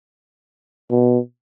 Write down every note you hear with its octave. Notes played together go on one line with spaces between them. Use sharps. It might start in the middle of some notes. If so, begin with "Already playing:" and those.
B2